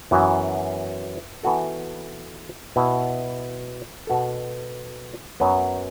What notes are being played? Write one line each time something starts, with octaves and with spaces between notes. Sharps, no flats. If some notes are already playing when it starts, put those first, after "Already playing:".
F#2 E3 B3 F#4 B4
E3 B3 F#4 A4
B2 B3 E4
B2 B3 F#4 A4
F#2 F#3 B3